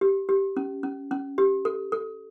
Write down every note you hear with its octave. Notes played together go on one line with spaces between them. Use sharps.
G4
G4
C#4
C#4
C#4
G4
A4
A4